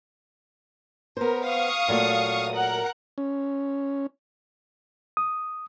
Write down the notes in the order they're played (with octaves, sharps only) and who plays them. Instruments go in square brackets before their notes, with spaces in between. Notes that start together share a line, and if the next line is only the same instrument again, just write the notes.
[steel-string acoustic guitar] B3 C5 [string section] A#4
[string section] F5 C#6 D#6
[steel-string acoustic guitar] A#2 F#3 A3
[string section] A#4 F#5
[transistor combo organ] C#4
[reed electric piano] D#6